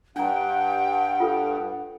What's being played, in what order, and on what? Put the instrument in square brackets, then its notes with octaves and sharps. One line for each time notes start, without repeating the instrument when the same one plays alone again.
[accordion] G2 [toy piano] D4 A#5 [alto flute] F#5 [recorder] G5
[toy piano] F4 A4 B4